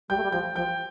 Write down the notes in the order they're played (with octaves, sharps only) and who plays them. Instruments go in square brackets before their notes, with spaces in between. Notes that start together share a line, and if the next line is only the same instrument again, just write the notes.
[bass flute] G3 [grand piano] G5 G6
[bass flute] A3
G3
[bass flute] F3 [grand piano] G5 G6
[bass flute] F3 [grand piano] G5 G6